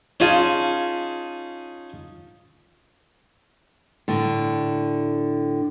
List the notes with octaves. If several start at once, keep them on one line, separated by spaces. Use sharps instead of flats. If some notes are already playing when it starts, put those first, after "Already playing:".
C#4 D#4 F4 G#4 A5
A2 D3